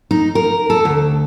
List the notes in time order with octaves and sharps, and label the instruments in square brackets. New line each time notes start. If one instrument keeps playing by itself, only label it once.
[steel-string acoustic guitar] D#4
A#4
A4
D2